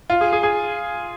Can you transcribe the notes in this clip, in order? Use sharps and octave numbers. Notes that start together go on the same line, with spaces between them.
F4
G#4
G#4
G#4